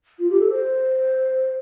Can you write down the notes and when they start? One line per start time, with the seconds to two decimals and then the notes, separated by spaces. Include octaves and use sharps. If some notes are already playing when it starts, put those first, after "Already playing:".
0.19 F4
0.30 G4
0.40 A4
0.50 C5